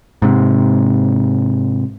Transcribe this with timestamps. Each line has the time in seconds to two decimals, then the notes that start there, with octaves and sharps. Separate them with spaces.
0.22 G#2 C3